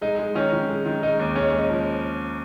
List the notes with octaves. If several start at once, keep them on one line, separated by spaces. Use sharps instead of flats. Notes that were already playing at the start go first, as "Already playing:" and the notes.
G#3 D#4
G#3
D#3 C#4
D#3
G#3
D#3
G#3 D#4
D#2
G#3 C#4
G#3
D#4
F3